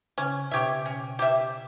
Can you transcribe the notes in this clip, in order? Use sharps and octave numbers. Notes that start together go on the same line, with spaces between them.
C#3 C#4
B2 G4 C#5 E5
C#4
G4 C#5 E5